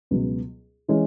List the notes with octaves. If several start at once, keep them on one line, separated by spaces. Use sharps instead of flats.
C#2 B2 F#3 B3
E3 G#3 C#4 G#4